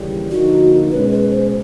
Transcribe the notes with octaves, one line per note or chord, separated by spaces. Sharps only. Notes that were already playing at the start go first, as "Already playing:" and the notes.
Already playing: D#2 C#3 E3 G3
D3 F3 A#3 D#4 F#4
B2 G#3 C#4 B4
B4
C5